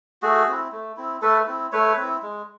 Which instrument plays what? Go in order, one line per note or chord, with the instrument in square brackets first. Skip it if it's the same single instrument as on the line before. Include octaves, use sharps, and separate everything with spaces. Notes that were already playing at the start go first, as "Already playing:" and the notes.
[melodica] A3 F#4 G#4
C4 E4
A3
C4 E4
A3 A4 B4
C4 E4
A3 B4 C#5
C4
E4
G#3